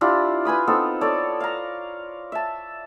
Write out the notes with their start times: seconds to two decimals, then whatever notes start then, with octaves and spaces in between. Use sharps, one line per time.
0.01 D4 E4 F4 G4
0.45 B4 G#5 B5 D#6
0.67 B3 C4 D#4 A4
1.01 A4 C#5 D5
1.40 F5 A#5
2.32 E5 A5